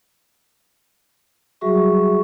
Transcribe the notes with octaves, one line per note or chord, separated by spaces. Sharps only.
F#3 G3 F#4 G#4 E5 C#6